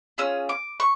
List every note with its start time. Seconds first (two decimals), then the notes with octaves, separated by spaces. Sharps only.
0.18 C#4 F4 G#4 E6
0.49 D6
0.80 C#6